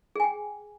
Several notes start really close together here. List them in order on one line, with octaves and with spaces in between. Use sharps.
G#4 G#5 G5